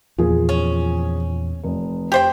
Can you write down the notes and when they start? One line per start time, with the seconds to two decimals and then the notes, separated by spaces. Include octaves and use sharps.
0.18 E2 A#2 F3 G#4
0.49 C#4
1.64 F1
2.12 G4 C5 G5